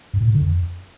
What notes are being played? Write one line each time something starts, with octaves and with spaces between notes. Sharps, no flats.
G2
A#2
A2
D3
F2